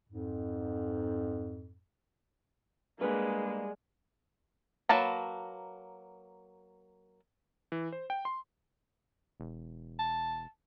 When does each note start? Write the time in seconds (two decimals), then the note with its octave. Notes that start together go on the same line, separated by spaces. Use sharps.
0.08 F2 G#2
3.01 G3 G#3 A#3 D4 G#4 B4 F#5
4.89 F#3 A#3 B4 A5 A#5
7.72 E3
7.92 C5
8.10 G5
8.25 C6
9.40 E1
9.99 A5